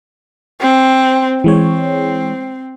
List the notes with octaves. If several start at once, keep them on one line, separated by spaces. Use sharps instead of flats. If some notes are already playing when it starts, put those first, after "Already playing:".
C4
E3 G#3 C4 C#5